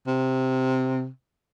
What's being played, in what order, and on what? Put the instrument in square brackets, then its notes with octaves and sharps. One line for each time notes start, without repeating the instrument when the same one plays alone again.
[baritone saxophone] C3